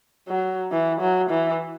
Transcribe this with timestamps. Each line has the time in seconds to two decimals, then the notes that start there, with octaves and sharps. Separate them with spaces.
0.28 F#3
0.72 E3
1.01 F#3
1.30 E3